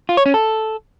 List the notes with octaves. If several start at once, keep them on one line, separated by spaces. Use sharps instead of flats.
F4
C#5
C#4
A4